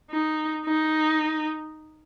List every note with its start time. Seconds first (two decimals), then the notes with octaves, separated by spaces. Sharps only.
0.10 D#4
0.65 D#4